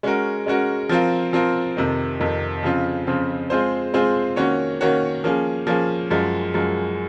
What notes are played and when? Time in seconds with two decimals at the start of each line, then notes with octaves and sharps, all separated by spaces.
0.03 G#3 C#4 F#4 A#4
0.46 G#3 C#4 F#4 A#4
0.89 F3 C4 F4 A#4
1.33 F3 C4 F4 A#4
1.77 F2 C3 D#3
2.20 F2 C3 D#3
2.63 C#3 F3 C4 F4
3.07 C#3 F3 C4 F4
3.50 G#3 C4 F4 G#4 C5
3.94 G#3 C4 F4 G#4 C5
4.36 D#3 A#3 C#4 F#4 C#5
4.81 D#3 A#3 C#4 F#4 C#5
5.24 F3 A#3 C#4 G#4
5.67 F3 A#3 C#4 G#4
6.10 F#2 F3 G#3
6.54 F#2 F3 G#3